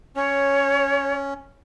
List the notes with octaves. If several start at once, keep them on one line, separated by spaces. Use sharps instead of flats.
C#4 C#5